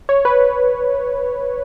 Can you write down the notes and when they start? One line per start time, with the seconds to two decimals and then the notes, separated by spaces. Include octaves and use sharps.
0.09 C#5
0.25 B4